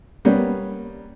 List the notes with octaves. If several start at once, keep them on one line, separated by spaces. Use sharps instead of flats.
G3 A#3 B3 C#4